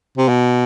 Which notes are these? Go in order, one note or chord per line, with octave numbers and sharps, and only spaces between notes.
C3
B2